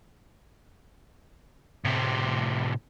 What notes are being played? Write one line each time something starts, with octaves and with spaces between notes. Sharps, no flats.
A2 C3